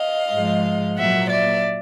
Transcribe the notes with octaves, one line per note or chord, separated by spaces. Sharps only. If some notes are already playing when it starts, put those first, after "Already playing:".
Already playing: D#5 F5
G#2 F3 G#3
A#2 F#3 A#3 E5 F#5
D5 E5